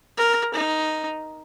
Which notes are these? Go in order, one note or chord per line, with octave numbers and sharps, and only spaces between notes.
A#4
D#4